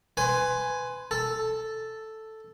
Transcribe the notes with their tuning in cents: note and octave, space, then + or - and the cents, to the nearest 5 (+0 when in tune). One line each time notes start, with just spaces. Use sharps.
B4 +20 G#5 +0 C6 +0
A4 +0 A5 +0